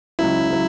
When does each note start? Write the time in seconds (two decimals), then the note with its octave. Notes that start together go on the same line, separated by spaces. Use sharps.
0.19 C#2 C#3 F#3 E4
0.50 C#3 F#3